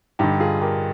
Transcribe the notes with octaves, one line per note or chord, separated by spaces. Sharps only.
G2 D3 D#4 G4
F4 G#4
G4 A#4